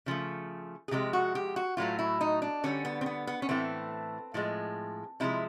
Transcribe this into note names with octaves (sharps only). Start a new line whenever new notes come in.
C#3 F3 A3
G#4
C3 F3 G#3 G4
F#4
G4
F#4
A2 F#3 A3 F4
E4
D#4
D4
D3 G3 C#4
B3
C4
B3
B3
C#4
A2 E3 A3 C4
A2 F3 G#3
C3 F3 G#3 E4